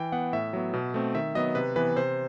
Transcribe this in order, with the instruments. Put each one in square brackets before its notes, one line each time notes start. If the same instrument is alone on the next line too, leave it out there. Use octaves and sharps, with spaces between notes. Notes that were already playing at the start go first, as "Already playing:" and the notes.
Already playing: [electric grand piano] E3 G5
B3 F#5
A2 E5
F#3 B3
B2
A3 C4
D#3 E5
F#3 B3 D#5
C3 B4
E3 B3 B4
C3 C5